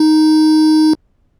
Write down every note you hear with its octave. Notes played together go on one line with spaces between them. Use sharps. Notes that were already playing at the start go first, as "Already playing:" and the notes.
Already playing: D#4